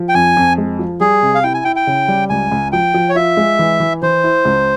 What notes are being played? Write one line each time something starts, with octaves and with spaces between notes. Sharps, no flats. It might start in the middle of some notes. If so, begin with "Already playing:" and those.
Already playing: F3
G5
F2 G#5
F2
G#3
F3
G3 G#4
C3
F5
E4 G5
G#5
E4 G5
G5
C#3
G3
C#2 G#5
C#2
F3 G5
F3
C#5
F4 E5
G#3
E3
E3
E3 C5
E4
C#2